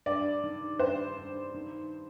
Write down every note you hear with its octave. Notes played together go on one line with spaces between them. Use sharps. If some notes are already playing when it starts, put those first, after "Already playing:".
G2 D5
D#3
G2 C5
G2
D#3